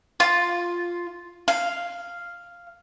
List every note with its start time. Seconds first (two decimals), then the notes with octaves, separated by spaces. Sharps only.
0.20 F4
1.48 F5